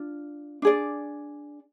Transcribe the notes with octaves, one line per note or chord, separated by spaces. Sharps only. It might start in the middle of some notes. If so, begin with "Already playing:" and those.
Already playing: D4 F4
D4 G#4 D5